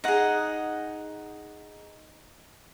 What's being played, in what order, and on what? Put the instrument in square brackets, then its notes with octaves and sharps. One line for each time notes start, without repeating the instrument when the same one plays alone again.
[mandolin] D#4 F#5 [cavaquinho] G#4 D#5